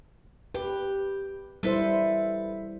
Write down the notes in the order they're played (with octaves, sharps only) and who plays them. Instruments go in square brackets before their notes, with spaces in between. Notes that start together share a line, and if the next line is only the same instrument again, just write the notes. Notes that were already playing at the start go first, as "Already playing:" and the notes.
[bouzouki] G4 [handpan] B4
[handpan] G3 E4 C5 [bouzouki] A4 B4 E5